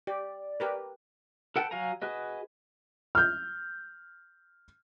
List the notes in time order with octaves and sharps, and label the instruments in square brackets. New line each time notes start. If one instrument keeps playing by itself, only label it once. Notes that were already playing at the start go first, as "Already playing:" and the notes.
[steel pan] G4 [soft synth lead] D5
[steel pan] G4 A#4 B4
[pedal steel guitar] A4 B4 F#5 G5 A5
F#3 F#4 F5 G#5 A#5
F#4 G#4 B4 D#5
[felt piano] F6 G6